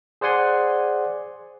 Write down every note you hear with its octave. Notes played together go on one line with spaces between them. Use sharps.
G#4 C5 D5 F#5 G#5 C6